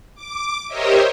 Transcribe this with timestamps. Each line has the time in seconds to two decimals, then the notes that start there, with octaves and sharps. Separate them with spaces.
0.15 D6
0.68 G4 A#4 C5 C#5 D#5 E5